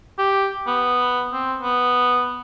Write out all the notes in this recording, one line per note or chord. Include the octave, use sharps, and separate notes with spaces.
G4
B3
C4
B3